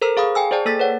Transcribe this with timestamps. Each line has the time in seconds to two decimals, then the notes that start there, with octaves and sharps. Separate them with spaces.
0.01 A4 A#4 C5 A#5 E6
0.17 G#4 F5 B5 D#6
0.35 G5 G#5 E6
0.51 G#4 C5 D5 G5 A5
0.65 A#3 A4 E6 A6 B6
0.80 B4 C#5 F#5